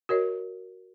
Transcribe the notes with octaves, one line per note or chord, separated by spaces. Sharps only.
F#4 A#4 C#5 D#5